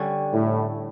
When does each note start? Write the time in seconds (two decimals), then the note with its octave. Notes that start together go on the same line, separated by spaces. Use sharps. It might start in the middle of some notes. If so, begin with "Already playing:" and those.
Already playing: D3 G3 C#4
0.33 A2